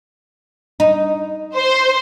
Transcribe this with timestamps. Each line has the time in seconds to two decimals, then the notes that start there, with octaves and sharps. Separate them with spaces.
0.80 D#4
1.55 C5